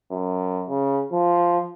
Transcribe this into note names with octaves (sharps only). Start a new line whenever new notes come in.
F#2
C#3
F3